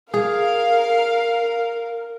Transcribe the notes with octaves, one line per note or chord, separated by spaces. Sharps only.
G#4 A#4 F5